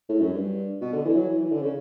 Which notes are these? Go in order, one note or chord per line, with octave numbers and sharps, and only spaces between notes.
A2
F#2
G2
B2
D3
E3
F#3
E3
E3
D3
C#3